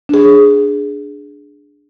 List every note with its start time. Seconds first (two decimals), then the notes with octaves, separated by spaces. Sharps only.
0.09 D4 G#4